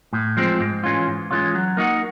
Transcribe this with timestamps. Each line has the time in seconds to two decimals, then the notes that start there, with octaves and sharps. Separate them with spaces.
0.13 A2
0.37 F3 G#3 C4
0.60 G#2
0.84 E3 G#3 C#4 F4
1.07 G#2
1.31 E3 G#3 C#4 F4
1.55 F#3
1.77 A#3 D#4 F#4